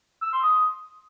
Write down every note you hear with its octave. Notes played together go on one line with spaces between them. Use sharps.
E6
C6
D#6